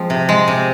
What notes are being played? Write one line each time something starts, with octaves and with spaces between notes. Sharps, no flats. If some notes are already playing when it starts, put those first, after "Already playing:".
Already playing: F3 G#3 C4
C3
G#3
C3